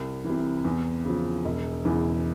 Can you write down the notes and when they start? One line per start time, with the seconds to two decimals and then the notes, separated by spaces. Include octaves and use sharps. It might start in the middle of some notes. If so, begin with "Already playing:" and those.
Already playing: C2
0.24 E3
0.30 C3
0.65 E2
1.05 C#3 F3
1.45 E1
1.85 E2 C#3 E3